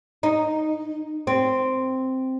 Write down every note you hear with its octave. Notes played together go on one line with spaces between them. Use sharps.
D#4
C4